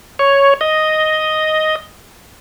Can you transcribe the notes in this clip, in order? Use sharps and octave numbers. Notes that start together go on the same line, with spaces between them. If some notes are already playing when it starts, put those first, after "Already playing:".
C#5
D#5